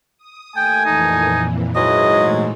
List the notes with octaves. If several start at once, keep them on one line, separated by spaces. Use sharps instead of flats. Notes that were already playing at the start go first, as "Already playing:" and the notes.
D#6
D#2 A3 G5 G#5
F2 A#2 E3 D#4
G#2 F#3 G#3 E4 B4 D#5
A#2 E3 A3